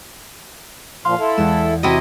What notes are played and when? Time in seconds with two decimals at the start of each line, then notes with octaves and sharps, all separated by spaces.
1.05 A#2 F3 F5 C6
1.19 E4 A4
1.38 E2 G#3 E7
1.83 C3 E4 F#4 D#5